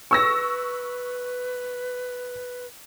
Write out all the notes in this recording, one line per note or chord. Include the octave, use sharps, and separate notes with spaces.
B4 C#6 E6 A#6